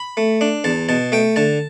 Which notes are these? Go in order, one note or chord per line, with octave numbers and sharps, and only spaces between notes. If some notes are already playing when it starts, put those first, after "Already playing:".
Already playing: B5
A3
D4
E2 A5
B2 A5
A3 G5
D3 A5